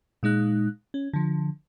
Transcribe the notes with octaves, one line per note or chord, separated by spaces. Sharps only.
A#2 G#3 D#4 F#6
C#4
D3 F3